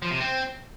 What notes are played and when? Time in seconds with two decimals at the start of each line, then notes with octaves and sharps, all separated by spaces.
0.02 F3
0.11 C3
0.20 C4